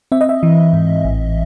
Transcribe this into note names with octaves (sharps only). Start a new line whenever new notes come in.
C4 E5
D#5
E5
E3
G#2
A1